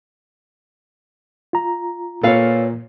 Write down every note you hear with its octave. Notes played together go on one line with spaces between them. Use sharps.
F4 A#5
A#2 A4 B4 C#5 F5